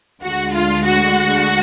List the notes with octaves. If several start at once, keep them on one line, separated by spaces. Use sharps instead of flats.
D2 D3 G#3 F#4
F4
F#4